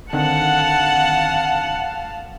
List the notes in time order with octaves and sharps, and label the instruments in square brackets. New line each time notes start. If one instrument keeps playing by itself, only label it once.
[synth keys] D3 D#3 C4 [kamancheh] F5 A5 [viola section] F#5